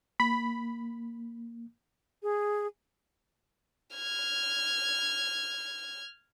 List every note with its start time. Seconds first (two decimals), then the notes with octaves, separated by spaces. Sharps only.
0.20 A#3 B5
2.23 G#4
3.95 F6 G#6